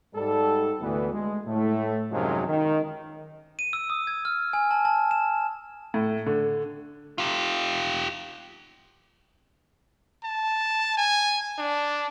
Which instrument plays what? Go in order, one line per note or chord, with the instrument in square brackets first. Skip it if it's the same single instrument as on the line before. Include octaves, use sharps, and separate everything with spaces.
[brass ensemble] G#2 G3 A4
D2 E3 B3
G#3
A2 A3
F#2 C3 D#3 F3 F#3 G#3
D#3
[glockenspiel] D#7
E6
D#6
G#6
F6
G#5
A5
A5
E7
[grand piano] A2
D3
[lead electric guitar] F4 G4
[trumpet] A5
G#5
D4